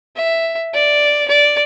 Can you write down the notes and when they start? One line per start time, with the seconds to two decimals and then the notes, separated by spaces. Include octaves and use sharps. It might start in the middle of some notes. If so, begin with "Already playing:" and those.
0.16 E5
0.74 D5
1.28 D5